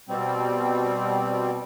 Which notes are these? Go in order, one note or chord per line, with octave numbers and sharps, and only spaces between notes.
B2 G3 C4